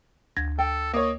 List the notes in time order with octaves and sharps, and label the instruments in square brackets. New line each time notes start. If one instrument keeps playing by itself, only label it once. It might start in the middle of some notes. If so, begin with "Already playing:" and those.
[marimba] D2 G#6 A#6
[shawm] A4 [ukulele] G5
[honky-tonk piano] A#3 C#5 [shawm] D#5